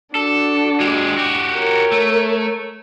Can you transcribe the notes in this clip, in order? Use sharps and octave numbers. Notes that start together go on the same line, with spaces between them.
D4 F#4 A4
G#3 G4
F#4 G4
A#4 C#5
A3